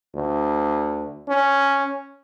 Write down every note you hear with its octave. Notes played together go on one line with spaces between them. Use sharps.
D2
C#4